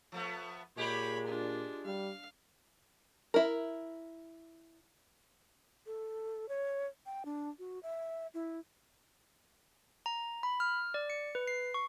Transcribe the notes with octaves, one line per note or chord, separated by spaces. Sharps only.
F3 A3 B3
A#2 G#3 G4 C#5 B5
D4 F4
G3 F5
E4 A#4
A4
C#5
G5
D4
F#4
E5
E4
A#5
B5
F6
D5
C#7
B4
C7
C#6